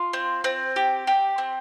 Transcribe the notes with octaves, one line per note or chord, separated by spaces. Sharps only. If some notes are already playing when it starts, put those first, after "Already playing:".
Already playing: F4
C4
C4
G4
G4
C4